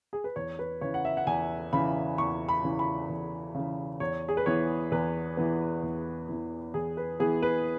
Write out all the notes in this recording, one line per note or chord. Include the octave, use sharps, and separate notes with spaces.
G#4
B4
E2 C#5
B4
C#3 E3 C#5
F#5
E5
F#5
E2 G#5
C#3 E3 B5
E2 C#6
B5
C#3 E3
B5
E2
C#3 E3
E2 C#5
G#4
B4
E3 B3 C#5
E2 B4
E3 B3
E2
E3 B3
E2 G#4
B4
E3 B3 G#4
B4